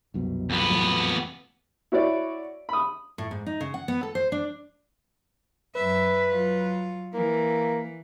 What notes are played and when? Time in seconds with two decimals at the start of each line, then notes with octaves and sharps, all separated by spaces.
0.14 C2 F#2 B2
0.50 F2 B3
0.70 E2 A2 F#3
1.92 E4 F#4 C#5 D5
2.69 B5 D#6
3.18 A2
3.31 G#2
3.46 D#4
3.61 C#3
3.74 F#5
3.88 B3
4.03 A4
4.15 C5
4.32 D4
5.75 F#2 B4 E5
6.30 F#3 F4
7.14 E3 A#3